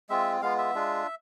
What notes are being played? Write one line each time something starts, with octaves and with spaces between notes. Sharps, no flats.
G#3 C4 F4 E5
G#3 B3 F4 F5
E5
G#3 D4 F4